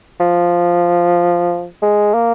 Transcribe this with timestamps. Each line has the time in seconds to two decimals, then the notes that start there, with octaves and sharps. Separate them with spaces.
0.20 F3
1.82 G#3
2.14 A#3